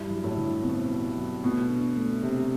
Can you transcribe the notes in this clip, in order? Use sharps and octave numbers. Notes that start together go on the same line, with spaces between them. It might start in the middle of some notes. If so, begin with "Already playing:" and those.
Already playing: G2 E4
F#3
A2
D3
B2 C4
E4
F#3
B2 A3
D4
A3
C3 G4